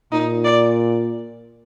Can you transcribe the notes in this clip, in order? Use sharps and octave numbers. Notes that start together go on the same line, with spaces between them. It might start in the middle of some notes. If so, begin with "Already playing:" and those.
A#2 D#4
D5